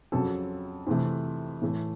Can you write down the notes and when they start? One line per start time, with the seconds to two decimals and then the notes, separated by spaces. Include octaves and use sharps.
0.12 F2 C#3 F#3 A4
0.87 F2 C3 E3 A3
1.62 A2 E3 A3